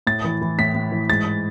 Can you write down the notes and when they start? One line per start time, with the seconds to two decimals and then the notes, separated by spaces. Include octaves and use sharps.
0.07 A2 A6
0.24 E3
0.42 E3
0.59 A2 B6
0.75 A2
0.92 E3
1.09 G#2 A6